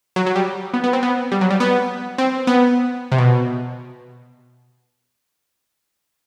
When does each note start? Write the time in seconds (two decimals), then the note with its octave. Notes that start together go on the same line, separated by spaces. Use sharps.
0.16 F#3
0.26 F#3
0.36 G3
0.74 B3
0.84 B3
0.93 C4
1.03 B3
1.32 G3
1.41 F#3
1.51 G3
1.60 B3
2.18 C4
2.47 B3
3.12 C3
3.18 B2